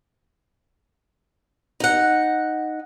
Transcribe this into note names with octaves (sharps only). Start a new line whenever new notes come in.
D#4 F#5